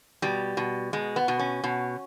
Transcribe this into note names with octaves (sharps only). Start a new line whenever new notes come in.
B2 G3
B2
B2 G#3
B3
B2
C#4
B2